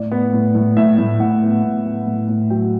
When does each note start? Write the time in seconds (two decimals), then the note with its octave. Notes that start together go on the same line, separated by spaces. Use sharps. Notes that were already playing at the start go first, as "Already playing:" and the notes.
Already playing: A2 D5
0.11 B3
0.33 A2
0.55 A2
0.77 A2 E5
0.98 A2
1.20 A2 F#5
1.42 B3
1.64 A2
1.85 B3
2.07 A2
2.29 A2
2.50 F#3 G5